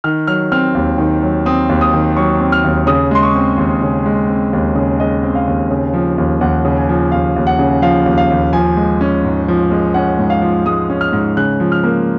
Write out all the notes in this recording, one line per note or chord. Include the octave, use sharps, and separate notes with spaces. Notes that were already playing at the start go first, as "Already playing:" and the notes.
D#3 F6
F#3 F6
C4 F6
D#2
D#3
F#3
C4 D#6
D#2
D#6
D#3
F#3 C#6
C4
F6
D#2
C#3 D#6
G#3 C6
C#6
C4
D#2
C#3
G#3
C4
D#2
C#3
G#3 D#5
C4
F5
D#2
C#3
F3
D#2
D#2 F#5
C#3
G#5
F3
D#2 F5
D#2
F#5
C#3
F3 F5
D#2
F5
D#2
F3 G#5
G#3
C#4
G#2
F3
G#3
C#4 F#5
G#2
F5
F3
G#3 D#6
C#4
F6
G#2
C#3 F#6
F3
F6
A#3